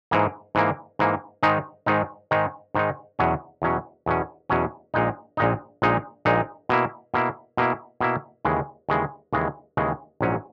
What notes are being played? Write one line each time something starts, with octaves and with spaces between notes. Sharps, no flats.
G#2 E3 A#3
G#2 E3 A#3
G#2 E3 A#3
G#2 D#3 G#3 D#4
G#2 D#3 G#3 D#4
G#2 D#3 G#3 D#4
G#2 D#3 G#3 D#4
E2 B2 F#3 C#4
E2 B2 F#3 C#4
E2 B2 F#3 C#4
E2 B2 F#3 C#4
A#1 A#2 G#3 D#4
A#1 A#2 G#3 D#4
A#1 A#2 G#3 D#4
A#1 A#2 G#3 D#4
B2 A#3 E4
B2 A#3 E4
B2 A#3 E4
B2 A#3 E4
D#2 C#3 E3 G#3
D#2 C#3 E3 G#3
D#2 C#3 E3 G#3
D#2 C#3 E3 G#3
A#1 G#2 F#3 C#4